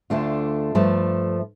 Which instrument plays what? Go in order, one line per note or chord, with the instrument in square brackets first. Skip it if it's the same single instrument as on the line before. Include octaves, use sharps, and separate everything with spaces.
[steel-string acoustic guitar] D2 D3 A3 D4 F4
G2 F3 A3